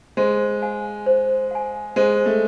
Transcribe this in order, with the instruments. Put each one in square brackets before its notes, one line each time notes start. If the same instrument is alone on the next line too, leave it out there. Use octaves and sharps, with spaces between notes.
[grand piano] G#3 [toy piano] C5
[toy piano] F5 G#5
C5
F5 G#5
[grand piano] G#3 [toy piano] C5
[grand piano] A3